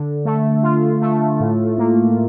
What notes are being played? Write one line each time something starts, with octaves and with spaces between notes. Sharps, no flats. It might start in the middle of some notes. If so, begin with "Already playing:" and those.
Already playing: D3
A3
F4
A3
A2
A#3